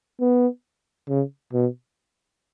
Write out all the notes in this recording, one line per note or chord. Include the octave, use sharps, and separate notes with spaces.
B3
C#3
B2